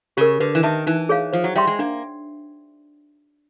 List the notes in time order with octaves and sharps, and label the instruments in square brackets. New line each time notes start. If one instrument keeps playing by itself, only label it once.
[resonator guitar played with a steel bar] C#3 [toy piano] G4 A#4
[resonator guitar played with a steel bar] D3 [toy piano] B4
[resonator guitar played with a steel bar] E3
[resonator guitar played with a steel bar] D#3 [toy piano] E5 A5
[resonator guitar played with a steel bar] E3 [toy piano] D#4
[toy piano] G#4 C#5 F5
[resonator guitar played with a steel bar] F3 [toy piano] C5
[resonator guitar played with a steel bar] F#3
[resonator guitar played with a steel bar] G3 [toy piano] E5 G5 C6
[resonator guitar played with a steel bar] G#3
[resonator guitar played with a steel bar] A#3 [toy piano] D4